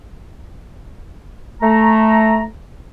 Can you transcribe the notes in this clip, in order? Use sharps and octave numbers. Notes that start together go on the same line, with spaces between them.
A3 A#5